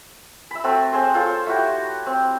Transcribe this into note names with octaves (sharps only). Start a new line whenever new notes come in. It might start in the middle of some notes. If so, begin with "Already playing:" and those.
E5 B5
A3 C4 F#4 A4
C4 G#4 C5
F4 A4 C5 C#5
A3 E4 F#4 G4
C4